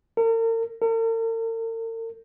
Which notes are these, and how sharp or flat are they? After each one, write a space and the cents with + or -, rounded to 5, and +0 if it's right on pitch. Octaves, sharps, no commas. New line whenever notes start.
A#4 -40
A#4 -45